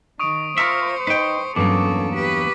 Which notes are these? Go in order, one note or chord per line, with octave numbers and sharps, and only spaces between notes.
D#3 C#6 D#6 D7
F4 A#4 C5 E5 C#7
D#4 B4 D#5 G5
E2 G2 F#3 A#3 C#4 A4 D6
G4 B4